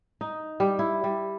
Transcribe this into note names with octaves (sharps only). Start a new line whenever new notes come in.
D#4
G3
E4
G3